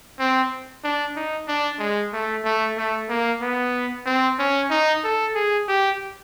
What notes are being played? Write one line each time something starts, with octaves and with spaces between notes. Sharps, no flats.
C4
D4
D#4
D4
G#3
A3
A3
A3
A#3
B3
C4
C#4
D#4
A4
G#4
G4